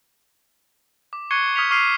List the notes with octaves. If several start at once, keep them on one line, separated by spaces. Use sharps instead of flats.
D6
C#6 F#6 G#6 C7 C#7 G7
D#6 F6 G#6 B6 C#7 F7
C#6 D6 F6 G#6 C7 D#7